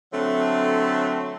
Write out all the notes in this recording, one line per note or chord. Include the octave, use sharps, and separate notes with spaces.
D3 F#3 A3 C4